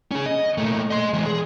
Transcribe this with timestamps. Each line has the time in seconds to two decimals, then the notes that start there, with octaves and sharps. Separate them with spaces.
0.11 C#4 G#4
0.26 D#5
0.58 A#2 A3
0.91 D#5 C6
1.13 E3 G#3
1.26 G#4